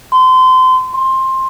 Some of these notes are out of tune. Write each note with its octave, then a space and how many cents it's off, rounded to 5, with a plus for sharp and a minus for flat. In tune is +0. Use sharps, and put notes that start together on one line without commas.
C6 -30
C6 +15